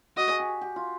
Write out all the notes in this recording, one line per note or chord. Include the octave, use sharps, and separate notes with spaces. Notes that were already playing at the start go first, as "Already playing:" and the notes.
F#4 D#5
G#4
G4
G4
F4